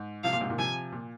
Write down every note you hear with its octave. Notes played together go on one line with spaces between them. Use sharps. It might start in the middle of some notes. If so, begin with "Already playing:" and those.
Already playing: G#2
C3 F3 F5
A#2
G#2 C3
A#2 D#3
C3 F3 G#5
A#2